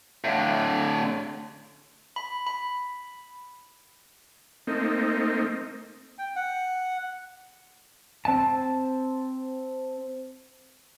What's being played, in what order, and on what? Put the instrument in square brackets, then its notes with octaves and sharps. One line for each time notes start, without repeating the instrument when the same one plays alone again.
[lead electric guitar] A2 D3
[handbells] B5
B5
[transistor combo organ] A3 A#3 C4 D#4
[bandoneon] G5
F#5
[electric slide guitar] C4 A5